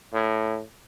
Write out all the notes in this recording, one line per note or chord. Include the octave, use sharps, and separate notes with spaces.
A2